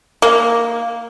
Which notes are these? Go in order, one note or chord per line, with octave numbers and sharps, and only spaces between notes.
A#3